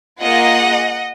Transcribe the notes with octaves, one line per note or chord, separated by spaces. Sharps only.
A#3 F4 G#4 D#5 F#5